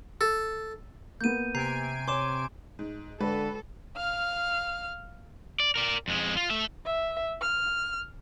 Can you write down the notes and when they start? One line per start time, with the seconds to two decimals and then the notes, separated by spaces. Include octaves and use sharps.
0.21 A4
1.21 A#3 B3 G6 D#7
1.55 C3 G#5 A#5 G6 C7 D7
2.08 C#5 C6 D6 E7
2.79 G#2
3.21 D3 G#3 A4 B4
3.97 F5 F6
5.60 D5
5.75 A#4 D5
6.08 F2 G#3
6.37 F4
6.50 A3 E5
6.86 E5
7.41 F6